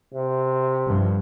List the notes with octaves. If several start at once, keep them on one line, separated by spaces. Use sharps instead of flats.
C3
G2 D3 F3